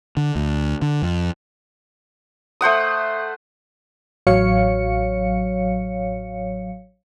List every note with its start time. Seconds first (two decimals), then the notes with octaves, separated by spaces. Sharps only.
0.17 D3
0.36 D2
0.82 D3
1.02 F2
2.61 A3 C5 F#5 D#6
4.27 A1 F#3 C#5 F5 C#7